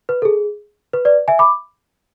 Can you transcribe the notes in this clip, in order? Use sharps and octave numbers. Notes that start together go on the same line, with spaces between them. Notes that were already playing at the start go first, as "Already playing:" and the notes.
B4
A4
G#4
B4
B4 D5
E5 G#5
B5 D6